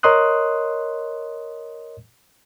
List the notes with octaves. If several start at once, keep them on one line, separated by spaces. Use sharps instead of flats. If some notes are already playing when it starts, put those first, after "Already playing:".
A#4 C#5 D#5 C6 D#6 F#6